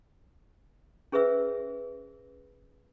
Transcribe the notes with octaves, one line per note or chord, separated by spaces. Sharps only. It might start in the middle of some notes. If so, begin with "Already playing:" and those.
C#4 G#4 B4 C5 E5 E6